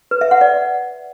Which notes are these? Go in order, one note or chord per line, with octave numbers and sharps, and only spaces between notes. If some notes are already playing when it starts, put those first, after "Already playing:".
B4
E5
F#5
D5